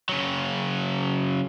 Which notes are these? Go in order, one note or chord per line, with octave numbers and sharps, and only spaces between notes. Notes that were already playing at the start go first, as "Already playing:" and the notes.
C#3 F#3